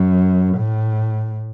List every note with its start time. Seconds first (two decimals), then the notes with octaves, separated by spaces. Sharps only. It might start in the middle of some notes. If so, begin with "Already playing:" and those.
Already playing: F#2
0.58 A2